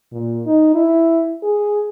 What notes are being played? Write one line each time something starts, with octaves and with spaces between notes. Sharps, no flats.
A#2
D#4
E4
G#4